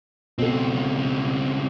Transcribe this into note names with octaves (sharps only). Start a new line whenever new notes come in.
C#2 B2 C4 A4